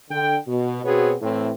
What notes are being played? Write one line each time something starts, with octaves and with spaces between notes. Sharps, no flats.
D3 G5
B2
B2 B3 C4 F#4 G#4 C#5
A2 E3 C4